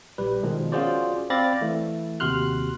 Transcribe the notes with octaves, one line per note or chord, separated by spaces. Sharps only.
A#1 G3 B4
B2 D#3 F3 G#3
C#4 F4 F#4 G#4 C5 D5
C4 D5 F5 B5 A6 A#6
E3 A3
D#2 C3 F#4 C6 F6 F#6